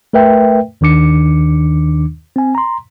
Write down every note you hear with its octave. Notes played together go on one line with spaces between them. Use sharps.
A3 A#4 B4 E5 G5
D#2 D#3 D4 D6 C#7
C4 G#5
A#5 C6